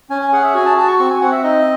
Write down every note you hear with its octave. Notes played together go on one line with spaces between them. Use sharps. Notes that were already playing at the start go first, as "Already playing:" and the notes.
C#4 G#5
G#5
G#4 F#5
E5
F#4 G#5
A5
F#4 A5
C#6
C4 C#6
G#5
C4 F#5
E5
D#4 D#5